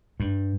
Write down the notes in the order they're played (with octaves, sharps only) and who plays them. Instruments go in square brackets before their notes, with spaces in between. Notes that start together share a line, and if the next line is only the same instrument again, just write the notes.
[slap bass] G2